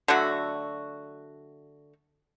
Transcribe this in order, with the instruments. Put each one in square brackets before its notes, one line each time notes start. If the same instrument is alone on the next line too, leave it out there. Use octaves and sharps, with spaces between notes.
[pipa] D3 F#3 A3 F#4